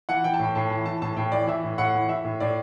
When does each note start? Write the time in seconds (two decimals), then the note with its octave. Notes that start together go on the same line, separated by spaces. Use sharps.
0.09 E3 F#5
0.24 E3 G5
0.34 A5
0.39 A2 G5
0.55 A2 A5
0.70 E3
0.86 E3 A5
1.02 A2 A5
1.16 A2 G5
1.32 E3 D5
1.47 E3 E5
1.64 A2
1.78 A2 F#5
1.95 E3
2.09 E3 E5
2.24 A2
2.40 A2 D5